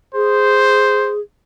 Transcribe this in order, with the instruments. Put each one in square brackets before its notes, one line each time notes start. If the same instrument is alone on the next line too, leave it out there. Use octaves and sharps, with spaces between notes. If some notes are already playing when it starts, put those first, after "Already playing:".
[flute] G#4 [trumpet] C5